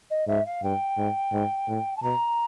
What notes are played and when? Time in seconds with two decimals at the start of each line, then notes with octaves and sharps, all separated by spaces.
0.10 D#5
0.27 G#2 E5
0.45 F5
0.63 G2 G5
0.98 G#2
1.33 G#2
1.68 A2
1.96 A5
2.02 B2 A#5